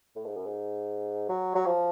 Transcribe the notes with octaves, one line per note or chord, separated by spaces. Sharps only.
A2
G#2
F#2
G#2
F#3
F#3
F3